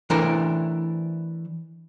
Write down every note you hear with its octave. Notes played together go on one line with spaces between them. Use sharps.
E3 A3 D4 A#4 C5